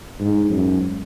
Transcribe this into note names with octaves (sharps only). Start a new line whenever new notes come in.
G#2
F#2